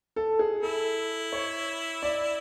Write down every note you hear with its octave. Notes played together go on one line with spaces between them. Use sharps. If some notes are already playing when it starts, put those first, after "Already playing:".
A4
G#4
E4 A4
C#5
D5